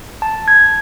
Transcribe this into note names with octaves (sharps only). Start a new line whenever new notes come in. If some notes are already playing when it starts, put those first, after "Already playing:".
A5
G#6